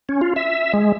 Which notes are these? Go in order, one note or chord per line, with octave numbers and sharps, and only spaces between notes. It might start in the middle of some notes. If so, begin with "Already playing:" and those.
C#4
F4
E5
G#3